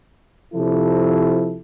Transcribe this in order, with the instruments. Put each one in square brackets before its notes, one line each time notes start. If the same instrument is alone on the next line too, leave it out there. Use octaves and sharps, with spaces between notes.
[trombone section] C3 F3 E4 A4